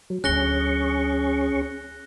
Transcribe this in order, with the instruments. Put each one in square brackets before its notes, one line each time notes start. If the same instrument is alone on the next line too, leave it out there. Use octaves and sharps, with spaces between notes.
[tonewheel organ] F#3
[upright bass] D2 F#3 [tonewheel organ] C#4 G#4 C#6 [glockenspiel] F#6 A#6 G7